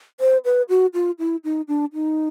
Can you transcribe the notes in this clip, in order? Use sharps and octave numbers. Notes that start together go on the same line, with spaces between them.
C5
B4
F#4
F4
E4
D#4
D4
D#4